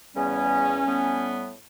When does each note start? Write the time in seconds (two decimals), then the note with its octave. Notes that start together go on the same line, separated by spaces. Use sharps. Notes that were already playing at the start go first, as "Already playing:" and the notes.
0.15 E2 C#3 G3 B3 C#4
0.86 A2 G3 B3